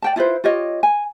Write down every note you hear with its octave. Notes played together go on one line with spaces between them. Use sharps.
D5 G5 A5
E4 F4 B4 C5
F4 G4 C#5 D#5
G#5